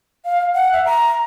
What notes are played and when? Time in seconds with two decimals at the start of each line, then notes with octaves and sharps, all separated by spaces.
0.25 F5
0.54 F#5
0.72 E5
0.86 A#5